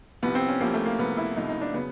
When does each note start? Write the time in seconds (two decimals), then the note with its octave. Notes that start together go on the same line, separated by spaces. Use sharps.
0.22 C2 C3 F3 B3
0.35 C4
0.49 C#4
0.60 C2 C3 F3 A#3
0.74 A3
0.85 A#3
0.99 C2 C3 F3 B3
1.17 E4
1.36 C2 C3 F3 D#4
1.49 D#4
1.61 D4
1.74 C#3 F#3 B3